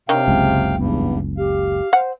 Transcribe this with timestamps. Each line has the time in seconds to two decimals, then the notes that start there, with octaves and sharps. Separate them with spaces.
0.09 C3 D#3 D4 C#5 D#5 F5 G5
0.28 F#1 C#2 C#3
0.76 E2 G2 B3
1.37 G4 F5
1.93 C5 F#5